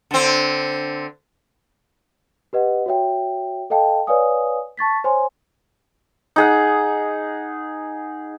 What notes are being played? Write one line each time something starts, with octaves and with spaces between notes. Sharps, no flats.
D3 C4
G4 B4 D#5 F#5
F#4 C#5 E5 G5
A4 D#5 F5 G5 A5
B4 C#5 D5 F5 G#5 D#6
A5 C#6 A6 B6
C5 C#5 G#5 C6
D#4 G#4 F#5